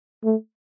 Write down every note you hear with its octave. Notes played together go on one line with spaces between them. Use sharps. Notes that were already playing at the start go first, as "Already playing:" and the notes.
A3